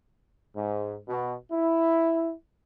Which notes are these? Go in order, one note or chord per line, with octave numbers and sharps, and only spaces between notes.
G#2
B2
E4